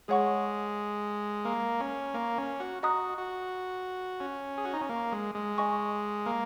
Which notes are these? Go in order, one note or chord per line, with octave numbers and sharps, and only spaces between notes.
G#3 G#4 C#5 F#5 C#6
A#3
C#4
A#3
C#4
F#4
F#4 D#5 A#5 D#6 F#6
F#4
C#4
G#4
F#4
D#4
C#4
A#3
G#3
G#3
D#5 G#5 C#6
A#3